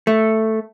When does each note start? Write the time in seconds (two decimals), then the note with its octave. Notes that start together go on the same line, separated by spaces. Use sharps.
0.07 A3